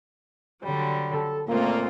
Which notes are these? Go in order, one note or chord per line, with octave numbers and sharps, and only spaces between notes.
D3 F#3 G3
A4
C#2 A#2 A3 A#3 C4 F4